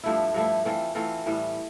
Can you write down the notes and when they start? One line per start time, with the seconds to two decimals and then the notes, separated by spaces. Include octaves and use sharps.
0.03 G2 F3 A3 E4
0.34 G2 F3 A3 E4
0.65 E3 A3 C4 F4
0.95 E3 A3 C4 F4
1.26 A2 E3 G3